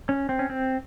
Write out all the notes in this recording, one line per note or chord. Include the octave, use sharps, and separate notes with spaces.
C#4
C4
C#4
C4